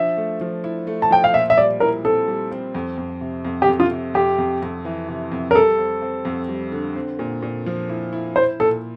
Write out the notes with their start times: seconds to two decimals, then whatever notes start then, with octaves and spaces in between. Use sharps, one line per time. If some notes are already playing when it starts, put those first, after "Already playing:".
Already playing: F3 D4 E5
0.17 A3
0.41 F3
0.64 E4
0.87 A3
1.02 A5
1.10 F3 G5
1.24 F5
1.34 A#2 E5
1.50 E5
1.57 G3 D5
1.80 E4 A#4
2.04 C4 A4
2.28 G3
2.51 C4
2.75 F2
2.98 F2
3.21 C3
3.45 F2
3.62 G4
3.68 F2
3.80 F4
3.91 C3
4.14 F2 G4
4.38 F2
4.62 F2
4.85 E3
5.08 C3
5.32 F2
5.51 A#4
5.55 G3 A4
5.78 C4
6.02 C4
6.25 F2
6.49 G3
6.72 D3
6.96 C4
7.19 A#2
7.42 A#2
7.66 F3
7.89 E4
8.13 E4
8.36 E4 C5
8.60 A#2 A4